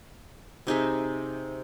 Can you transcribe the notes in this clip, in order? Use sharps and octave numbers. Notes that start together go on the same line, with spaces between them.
C3 D#4 G#4 E5